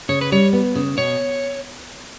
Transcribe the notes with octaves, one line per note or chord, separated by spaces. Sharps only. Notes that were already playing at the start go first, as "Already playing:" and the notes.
C#3 C#5
B4
G3 C#5
B3
C#3
B2 C#5